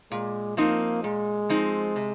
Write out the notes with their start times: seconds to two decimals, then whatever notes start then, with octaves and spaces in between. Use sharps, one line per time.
0.11 A#2 G#3
0.57 F3 A#3 C4 D#4
1.03 A#2 G#3
1.49 F3 C4 D#4
1.96 C3